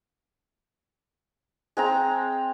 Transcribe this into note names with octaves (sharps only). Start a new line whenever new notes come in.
G#3 C4 A#5